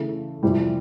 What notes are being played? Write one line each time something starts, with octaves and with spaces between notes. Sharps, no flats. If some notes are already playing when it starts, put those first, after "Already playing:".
Already playing: C#3 E3 A3
F2 C3 E3 G3